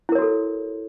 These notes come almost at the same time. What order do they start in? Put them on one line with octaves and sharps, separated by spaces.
E4 A#4 C#5 F#4 A4